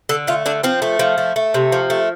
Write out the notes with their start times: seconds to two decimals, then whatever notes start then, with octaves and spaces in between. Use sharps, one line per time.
0.09 D3 A4
0.27 A3 F4
0.46 D3 D4
0.63 F3 C4
0.82 A3
0.99 F3
1.18 A3
1.36 A3
1.54 C3
1.72 F3
1.90 A3